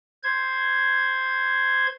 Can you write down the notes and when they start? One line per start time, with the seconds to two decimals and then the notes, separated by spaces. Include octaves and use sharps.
0.23 C5 G#6